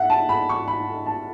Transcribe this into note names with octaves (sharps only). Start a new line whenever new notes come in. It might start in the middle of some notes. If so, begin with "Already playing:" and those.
Already playing: E5 F#5
A5
B5
C#6
B5
A5